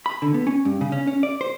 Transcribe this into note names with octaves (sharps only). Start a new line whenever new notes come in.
B5
D3
B3
C#4
G2
C#3
C#4
C#4
D5
C5